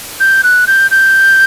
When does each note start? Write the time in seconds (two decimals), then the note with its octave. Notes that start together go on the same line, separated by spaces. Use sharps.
0.20 G6
0.44 F#6
0.67 G6
0.91 G6